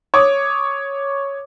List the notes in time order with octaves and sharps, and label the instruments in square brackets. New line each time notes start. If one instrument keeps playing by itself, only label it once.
[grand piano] C#5 D6 D#6